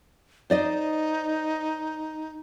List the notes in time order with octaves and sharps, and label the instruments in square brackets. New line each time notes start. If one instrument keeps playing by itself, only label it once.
[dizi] D#4 [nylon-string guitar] C5 D5 D#5